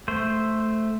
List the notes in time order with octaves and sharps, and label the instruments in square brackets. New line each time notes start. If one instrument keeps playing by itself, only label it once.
[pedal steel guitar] A3 C5